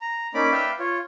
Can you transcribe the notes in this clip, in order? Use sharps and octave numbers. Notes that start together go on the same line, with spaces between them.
A#5
A#3 C#4 D#4 D5 B5 D6
B4 D5 E5 F5 G5
F4 C#5